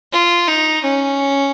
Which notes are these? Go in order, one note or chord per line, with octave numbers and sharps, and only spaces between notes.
F4
D#4
C#4